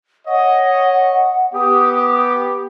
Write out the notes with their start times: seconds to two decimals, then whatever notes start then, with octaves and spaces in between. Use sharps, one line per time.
0.27 C#5 D#5 F#5
1.54 B3 G4 D#6